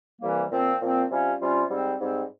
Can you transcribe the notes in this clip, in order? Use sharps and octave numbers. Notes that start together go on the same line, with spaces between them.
C2 C3 E3 G3 A#3
A#2 F3 C4
A#2 F3 C4
C3 G3 C#4 F4
C3 G3 C#4 F4
G#2 G3 C4
G#2 G3 C4